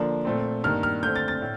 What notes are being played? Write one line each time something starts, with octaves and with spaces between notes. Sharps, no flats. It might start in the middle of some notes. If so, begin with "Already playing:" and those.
Already playing: D3 F3 A#3 D4
A#2 A3 C4
G2 D#3 A#3 F6
F6
D3 A3 C4 G6
A6
A6
A2